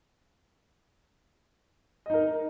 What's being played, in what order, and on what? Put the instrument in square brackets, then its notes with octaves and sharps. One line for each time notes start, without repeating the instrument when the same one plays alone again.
[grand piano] D#5
D#4
A#4